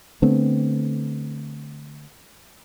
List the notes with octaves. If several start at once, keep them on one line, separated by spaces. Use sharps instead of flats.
D3 A3 B3 C4